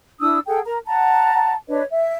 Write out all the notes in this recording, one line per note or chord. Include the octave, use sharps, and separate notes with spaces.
D4 E4 D#6 E6
G#4 A4 F#5 G5
A#4 A#5
F#5 A5 A#5
D4 B4 C#5 D#5
E5